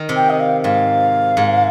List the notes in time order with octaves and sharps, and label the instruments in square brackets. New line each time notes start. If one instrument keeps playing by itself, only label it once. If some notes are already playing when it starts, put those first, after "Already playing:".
Already playing: [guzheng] D#3
C3
[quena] G5
D#5
F5
[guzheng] G#2 [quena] F5
[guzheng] G#2